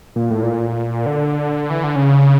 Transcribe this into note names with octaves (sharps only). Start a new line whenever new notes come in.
A#2
A2
A#2
D3
E3
D3
C#3